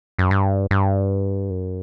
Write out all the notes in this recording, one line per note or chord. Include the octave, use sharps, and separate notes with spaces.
F#2
G2
G2
F#2